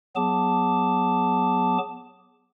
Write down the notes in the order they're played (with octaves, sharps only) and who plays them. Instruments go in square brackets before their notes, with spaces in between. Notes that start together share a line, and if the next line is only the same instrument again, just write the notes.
[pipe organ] F#3 B3 G#4 A5 D6